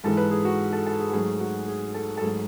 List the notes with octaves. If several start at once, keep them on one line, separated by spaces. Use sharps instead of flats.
G#2 E3 G#3 A4
B4
G#4
F#4
A4
A4
G#4
G#2 F#3 A3 G#4
F#4
G#4
A4
A4
G#2 F#3 A3 G#4